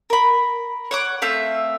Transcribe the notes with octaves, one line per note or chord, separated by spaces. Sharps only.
A#4 B5
C#5 F#5 D6
A3 C4 E5 F5